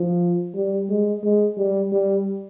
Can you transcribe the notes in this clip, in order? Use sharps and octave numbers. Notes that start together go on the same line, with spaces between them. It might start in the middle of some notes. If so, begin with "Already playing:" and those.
Already playing: F3
G3
G#3
G#3
G3
G3